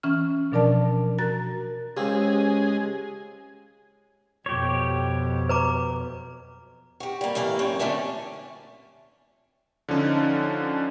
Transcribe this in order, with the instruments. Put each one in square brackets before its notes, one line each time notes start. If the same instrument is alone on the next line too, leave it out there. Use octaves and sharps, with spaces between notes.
[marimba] E3 C#4 F6
B2 F3 D4 A#4 D5 A5
F#4 A#4 A#5 A6
[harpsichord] C#2 C4 [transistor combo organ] G#3 G#4 [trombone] C#4 [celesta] G4
[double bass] F2 B2 [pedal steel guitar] G4 C#5
[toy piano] B4 A#5 D6
[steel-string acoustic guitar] F#4 G4
G3 A#3
A2 E3 A#3 D5
F#2 C4 C#5
F2 A#2 D3 A3 C#4 D4
[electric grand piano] D3 F3 C#4 D#4